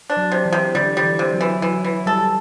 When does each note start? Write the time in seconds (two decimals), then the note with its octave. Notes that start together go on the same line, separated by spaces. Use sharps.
0.10 D4
0.17 F#3
0.32 C3
0.45 E3
0.53 C3
0.75 D3 G3
0.97 G3
1.04 E3
1.19 C3
1.34 F#3
1.41 E3
1.62 E3 F#3
1.84 E3
2.06 G3 A4